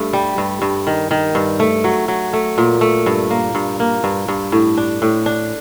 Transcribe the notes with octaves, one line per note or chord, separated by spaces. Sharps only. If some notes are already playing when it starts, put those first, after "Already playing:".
Already playing: G2 A3
G3
G2
G2
D#3
D#3
G2
A3
F#3
F#3
A3
A#2
A3
G2
A#3
G2
A#3
G2
G2
A2
D4
A2
D4